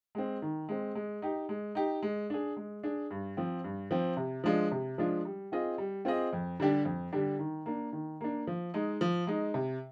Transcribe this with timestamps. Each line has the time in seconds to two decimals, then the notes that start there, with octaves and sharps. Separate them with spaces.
0.15 G#3 C4
0.42 D#3
0.69 G#3 C4
0.95 G#3
1.22 D#4 G4
1.49 G#3
1.75 D#4 G4
2.03 G#3
2.30 D4 G#4
2.57 G#3
2.83 D4 G#4
3.11 G2
3.37 F3 C4
3.64 G2
3.91 F3 C4
4.17 C3
4.44 F3 G#3 D4 F4
4.71 C3
4.98 F3 G#3 D4 F4
5.25 G3
5.52 C4 F4 G#4 D#5
5.78 G3
6.05 C4 F4 G#4 D#5
6.33 F2
6.60 D3 G3 D4 G4
6.85 F2
7.12 D3 G3 D4 G4
7.39 D#3
7.66 A#3 D4
7.93 D#3
8.21 A#3 D4
8.47 F3
8.74 G#3 D#4
9.01 F3
9.27 G#3 D#4
9.54 C3